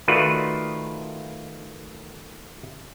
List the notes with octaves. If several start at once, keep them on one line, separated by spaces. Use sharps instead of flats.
D#3 A3 F4 F#4 B4 D5